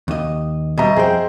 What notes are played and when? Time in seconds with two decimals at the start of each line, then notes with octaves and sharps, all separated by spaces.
0.08 D#2 D#5
0.78 B2 G3 D#5 E5 A#5
0.96 F2 G#4 C5 G5